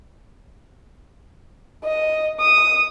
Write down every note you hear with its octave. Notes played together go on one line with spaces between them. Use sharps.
D#5
D#6